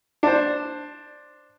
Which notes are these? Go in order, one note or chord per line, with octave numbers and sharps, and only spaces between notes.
D4 C5